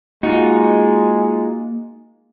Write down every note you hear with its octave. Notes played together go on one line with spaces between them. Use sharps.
G#3 A#3 D#4 F4 F#4